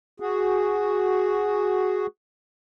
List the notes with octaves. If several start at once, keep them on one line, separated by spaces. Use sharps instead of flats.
F#4 G#4